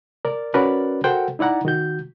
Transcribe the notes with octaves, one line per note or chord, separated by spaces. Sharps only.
A#4 D5
C#4 F#4 A#4 B4 D5
F#4 A4 A#4 C5 F#5 G5
D#4 E4 D5 F#5 A#5
D#3 F#4 G6